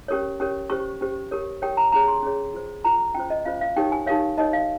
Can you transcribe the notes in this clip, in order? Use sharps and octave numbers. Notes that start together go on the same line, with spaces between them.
C#4 G4 A#4 C#5
C#4 G4 A#4 C#5
C#4 G4 C5 C#6
C#4 G4 C5
G4 A#4 C#5
G4 A#4 C#5 G5
A#5
C#4 G#4 C#5 A#5
C6
C#4 G#4 C#5
F4 C5
F4 C5 A#5
C#4 F4 C5 G5
D#5
C#4 F4 C5 F5
F5
D#4 G4 A#4 C#5 G5
G#5
D#4 G4 A#4 C#5 F5
D#4 A#4 C#5 D#5
F5